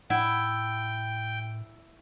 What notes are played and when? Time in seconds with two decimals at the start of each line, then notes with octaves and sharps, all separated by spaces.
0.10 A2 E4 F#5 G5